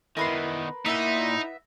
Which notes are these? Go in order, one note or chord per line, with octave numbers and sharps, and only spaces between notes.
D#3 B3 E4 A#4 B4 C6
A#2 B3 C4 D#4 E4 E5